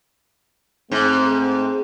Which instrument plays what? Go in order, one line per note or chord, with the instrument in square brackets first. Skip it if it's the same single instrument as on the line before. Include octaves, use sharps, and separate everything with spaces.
[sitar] G#2 [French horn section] A3 C4